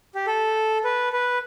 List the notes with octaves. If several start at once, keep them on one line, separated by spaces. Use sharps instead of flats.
G4
A4
B4
B4